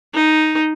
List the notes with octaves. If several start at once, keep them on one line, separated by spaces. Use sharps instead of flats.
D#4